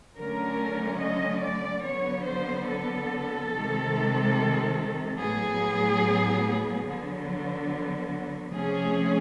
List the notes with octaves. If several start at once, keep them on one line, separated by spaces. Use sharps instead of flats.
D3 F#3 A3 C#4 A#4
D#5
D5
D3 F#3 B3 C#5
C5
A4
C3 D#3 G#3
A2 F#3 B3 G#4
D3 F#3 B3
C3 F3 A3 C#4 G#4